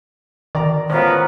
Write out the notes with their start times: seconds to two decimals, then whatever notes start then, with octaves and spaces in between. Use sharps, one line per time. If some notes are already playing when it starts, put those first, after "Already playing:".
0.55 D#3 D5 A#5
0.90 A1 B3 C#4 F4 A#4 C5 A#5